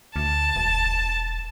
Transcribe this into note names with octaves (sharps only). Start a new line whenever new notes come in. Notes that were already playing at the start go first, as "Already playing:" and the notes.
D2 A5
E1